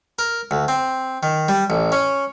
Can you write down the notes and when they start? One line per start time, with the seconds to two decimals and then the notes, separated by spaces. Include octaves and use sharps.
0.19 A#4
0.51 D2
0.68 C4
1.23 D#3
1.49 G3
1.70 A1
1.92 C#4